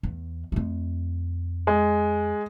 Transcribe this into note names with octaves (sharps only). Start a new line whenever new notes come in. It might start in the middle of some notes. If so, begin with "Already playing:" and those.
E2
F2 A3
G#3